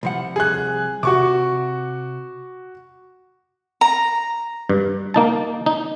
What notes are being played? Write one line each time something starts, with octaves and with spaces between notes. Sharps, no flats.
C2 F3 F#5
G#4 F#6
C3 F#4 C#6 D6
A#5
G2
A#3 D#4 A5
D#4